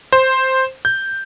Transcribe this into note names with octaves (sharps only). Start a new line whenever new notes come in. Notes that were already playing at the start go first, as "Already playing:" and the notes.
C5
G6